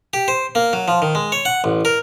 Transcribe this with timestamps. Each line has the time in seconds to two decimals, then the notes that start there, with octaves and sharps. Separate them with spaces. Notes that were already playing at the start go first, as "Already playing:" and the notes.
0.13 G4
0.28 C5
0.55 A#3
0.73 F#3
0.88 F3
1.02 D#3
1.15 G#3
1.32 C#5
1.45 F#5
1.64 A1
1.85 A#4